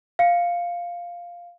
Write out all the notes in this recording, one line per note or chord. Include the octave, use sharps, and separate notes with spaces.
F5 C#7